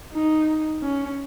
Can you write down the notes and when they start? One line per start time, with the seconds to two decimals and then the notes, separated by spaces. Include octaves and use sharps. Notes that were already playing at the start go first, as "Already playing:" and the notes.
0.13 D#4
0.82 C#4